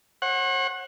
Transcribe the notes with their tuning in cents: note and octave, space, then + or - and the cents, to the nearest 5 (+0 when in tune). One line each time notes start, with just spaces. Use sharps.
C#5 -45 F#5 +0